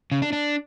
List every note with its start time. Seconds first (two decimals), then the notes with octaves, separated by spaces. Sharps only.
0.12 C#3
0.22 D4
0.33 D4